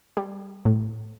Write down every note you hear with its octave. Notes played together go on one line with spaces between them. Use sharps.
G3
A2